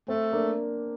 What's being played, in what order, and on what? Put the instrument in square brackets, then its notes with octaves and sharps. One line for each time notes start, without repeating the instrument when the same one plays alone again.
[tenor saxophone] A3 [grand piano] C4
[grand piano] A#3 D4